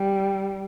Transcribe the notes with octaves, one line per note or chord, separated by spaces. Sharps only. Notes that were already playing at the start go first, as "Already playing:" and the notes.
Already playing: G3